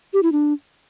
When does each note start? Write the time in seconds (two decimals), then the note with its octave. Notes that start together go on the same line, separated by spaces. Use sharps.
0.14 G4
0.23 E4
0.32 D4